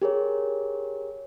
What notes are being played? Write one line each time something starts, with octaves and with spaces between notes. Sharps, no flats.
G4 G#4 A#4 C#5